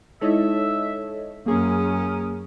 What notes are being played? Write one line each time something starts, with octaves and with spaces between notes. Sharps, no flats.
G#3 D#4 E4 A4 C#5 D#5 E5
F#2 A#3 C#4 G#4 A#4 D#6